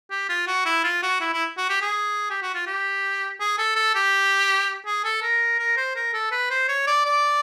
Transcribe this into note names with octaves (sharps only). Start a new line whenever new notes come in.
G4
F4
F#4
E4
F4
F#4
E4
E4
F#4
G4
G#4
G4
F#4
F4
G4
G#4
A4
A4
G4
G#4
A4
A#4
A#4
C5
A#4
A4
B4
C5
C#5
D5
D5